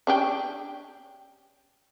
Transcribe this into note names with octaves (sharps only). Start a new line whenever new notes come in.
C#4 D4 G4